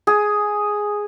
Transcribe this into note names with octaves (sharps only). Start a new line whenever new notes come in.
G#4